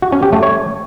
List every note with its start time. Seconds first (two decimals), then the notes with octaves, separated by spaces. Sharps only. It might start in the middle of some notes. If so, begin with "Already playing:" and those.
0.02 F#4
0.12 C#4
0.23 G4
0.33 A3
0.43 C#5